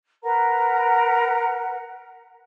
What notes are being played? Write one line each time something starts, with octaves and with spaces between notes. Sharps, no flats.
A#4 B4 F#5 A#5